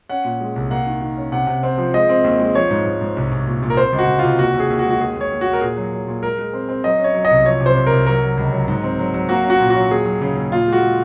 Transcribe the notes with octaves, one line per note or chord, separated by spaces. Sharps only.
C#4 F#5
A#2
G#3
C2
A#3 F#5
D#3
D#3
C#4
C3 F#5
C3
C4
F3
G#3 D#5
C4
D#2
G#3
F3 C#5
G#2
G#2
G#2
C2
C2
A#2
A#2
A#4
C4 C5
C#2
F#4
C#2
C3 F4
D#2 F#4
D#2
G#4
D#2
F#4
G#3
F#4
D#2 G#4
D#2 C#5
D#2
F#4
D#2
A#4
A#2 G#4
F#3
F#3
A#2
G#3 A#4
G#3
C4
C4
F#3 D#5
C#4 C#5
F#3
D#5
C2
F3 C#5
C3
C5
C2
C2 A#4
F#3 A#4
F#3
C#2
F#3
G#2
C4
F#3
F#3
A#3 F#4
C#4
F#4
A#2
F#4
F#3
D#2 G#4
F#3
C#3
D#2
A#2 F4
G#3
F#4
G#3